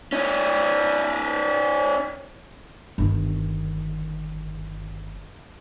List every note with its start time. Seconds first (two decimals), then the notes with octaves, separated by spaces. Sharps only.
0.12 C#4 D#4
2.98 G1 D#3